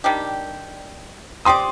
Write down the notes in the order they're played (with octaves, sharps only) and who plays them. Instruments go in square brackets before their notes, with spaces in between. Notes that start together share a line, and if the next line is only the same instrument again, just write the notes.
[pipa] D#3 G3 D4 G4
[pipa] C4 G4 D5 [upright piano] C6 D#6